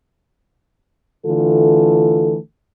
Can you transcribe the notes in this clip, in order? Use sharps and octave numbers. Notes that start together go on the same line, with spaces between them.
D3 E3 A3 F4 A4